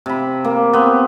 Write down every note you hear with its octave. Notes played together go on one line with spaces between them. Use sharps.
C3 B5
A#3
B3 C4